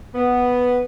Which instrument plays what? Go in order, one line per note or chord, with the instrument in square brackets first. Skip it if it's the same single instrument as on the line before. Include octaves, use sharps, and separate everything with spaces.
[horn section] B3